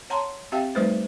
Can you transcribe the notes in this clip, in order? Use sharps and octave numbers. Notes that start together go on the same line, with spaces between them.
C#5 F#5 A5 A#5 C6
C4 G4 E5 F5 G5
F3 G3 A3 D#4 B4 C5